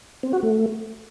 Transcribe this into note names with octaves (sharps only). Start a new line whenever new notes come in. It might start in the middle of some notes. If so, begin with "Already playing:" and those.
C4
F#4
A3